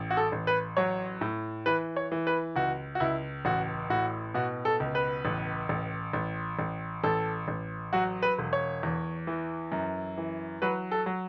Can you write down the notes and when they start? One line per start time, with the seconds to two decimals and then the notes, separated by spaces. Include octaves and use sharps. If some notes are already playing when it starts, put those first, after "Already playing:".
Already playing: A1
0.10 F#4
0.17 A4
0.32 A1
0.47 B4
0.77 F#3 C#5
1.21 A2
1.66 E3 B4
1.96 C#5
2.12 E3
2.27 B4
2.56 C#2 F#4
2.95 F#4
3.00 C#2 E4
3.45 A1 F#4
3.90 A2 F#4
4.34 B2 F#4
4.65 A4
4.80 C#2
4.95 B4
5.25 A1
5.69 A1
6.13 A1
6.59 A1
7.03 A1 A4
7.48 A1
7.93 F#3 F#4
8.23 B4
8.38 E1
8.53 C#5
8.83 E2
9.27 E3
9.72 F#2
10.18 E3
10.62 F#3 B4
10.91 A4
11.06 F#3